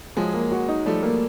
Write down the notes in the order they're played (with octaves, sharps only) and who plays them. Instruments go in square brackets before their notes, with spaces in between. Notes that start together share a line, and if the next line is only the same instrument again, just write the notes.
[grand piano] F3 [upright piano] F#3 G#3
[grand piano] A#3
F#4
D#4
[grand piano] F3 [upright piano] G3 A3
[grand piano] A#3